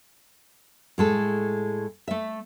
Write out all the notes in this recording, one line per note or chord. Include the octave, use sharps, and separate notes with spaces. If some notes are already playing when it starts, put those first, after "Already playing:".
A2 G#3 A4
A3 E5